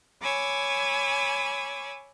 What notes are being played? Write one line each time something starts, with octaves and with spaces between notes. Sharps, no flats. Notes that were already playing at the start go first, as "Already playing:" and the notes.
C#5 G#5 B5 D6 E6 G#6